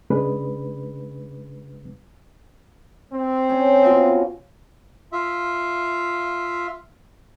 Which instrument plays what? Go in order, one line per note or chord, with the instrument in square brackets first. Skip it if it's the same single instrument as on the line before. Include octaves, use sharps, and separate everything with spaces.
[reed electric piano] C#3 G#3 D4 B4
[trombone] C4
[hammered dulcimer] C#4
B2 F4 D#5
[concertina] F4 E5